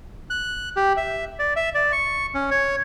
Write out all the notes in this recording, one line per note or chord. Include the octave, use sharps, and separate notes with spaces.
F#6
G4
E5
D5
E5
D5
C#6
C#4
C#5